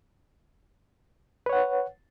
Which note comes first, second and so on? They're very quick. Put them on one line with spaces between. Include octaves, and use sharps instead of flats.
B4 C#5 F#5